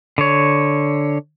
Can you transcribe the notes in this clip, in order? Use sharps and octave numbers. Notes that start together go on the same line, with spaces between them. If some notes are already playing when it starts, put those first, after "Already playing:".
D3 C#5